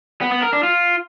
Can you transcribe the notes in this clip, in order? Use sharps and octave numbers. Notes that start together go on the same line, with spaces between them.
B3
B3
A#4
D4
F4